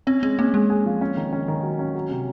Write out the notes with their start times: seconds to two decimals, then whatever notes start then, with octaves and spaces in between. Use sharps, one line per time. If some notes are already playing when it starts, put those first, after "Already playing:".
0.07 C4 C#4
0.23 G#3 C4
0.39 A#3 C#4
0.54 G#3 G#4
0.70 G#4
0.86 F3
1.01 C#4
1.17 D#3
1.33 C#4
1.48 D#3
1.63 F#3
1.79 C#4
1.95 F#3
2.11 C3